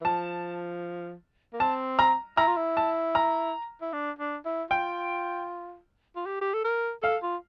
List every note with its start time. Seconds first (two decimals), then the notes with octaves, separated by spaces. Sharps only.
0.01 E3
0.05 F3 A5
1.53 A#3
1.60 C4 A5
1.99 A#5
2.37 E4 A#5
2.47 F4
2.57 E4
2.77 A5
3.15 A#5
3.81 E4
3.93 D4
4.19 D4
4.45 E4
4.70 F4 G5
6.16 F4
6.26 G4
6.41 G4
6.54 A4
6.64 A#4
7.03 A4 F5
7.22 F4